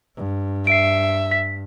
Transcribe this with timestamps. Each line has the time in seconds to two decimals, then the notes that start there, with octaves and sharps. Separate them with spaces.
0.16 G2
0.67 E5 C7 D7
1.31 B6